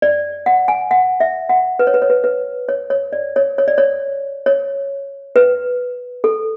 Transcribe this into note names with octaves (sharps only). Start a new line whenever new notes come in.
D5
F#5
G#5
F#5
E5
F#5
B4
C#5
B4
C#5
B4
B4
C#5
C#5
D5
C#5
C#5
D5
C#5
C#5
B4
A4